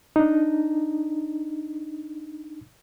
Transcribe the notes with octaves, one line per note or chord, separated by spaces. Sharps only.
D4 D#4